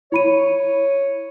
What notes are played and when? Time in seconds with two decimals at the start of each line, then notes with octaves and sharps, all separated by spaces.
0.12 E4 C#5 B5 D#7